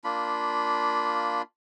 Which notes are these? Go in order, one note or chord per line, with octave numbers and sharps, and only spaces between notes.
A#3 D4 F4 B5